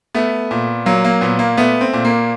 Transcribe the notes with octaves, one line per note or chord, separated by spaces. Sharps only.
A3 B3
A#2
F#3 A#3
A#3
A#2 B3
A#3
A3 B3
C4
A#2
A#3